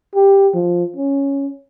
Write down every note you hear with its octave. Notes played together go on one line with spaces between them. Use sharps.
G4
F3
C#4